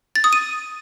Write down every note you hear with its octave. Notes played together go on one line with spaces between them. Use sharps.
A6
D#6
D#7